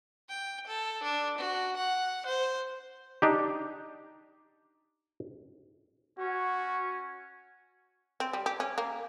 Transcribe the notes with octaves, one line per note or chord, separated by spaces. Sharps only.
G5
A4
D4
F#4
F#5
C5
D4 D#4 G4
C#4 F#4
C4
G3
G4
C#4
A#3